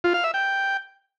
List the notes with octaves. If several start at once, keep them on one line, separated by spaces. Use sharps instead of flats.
F4
F5
E5
G5